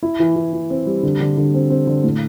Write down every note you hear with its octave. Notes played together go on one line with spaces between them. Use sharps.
E4
E3
E3
E4
C4
G3
D3
D3
D3
C4
C4
D3
A2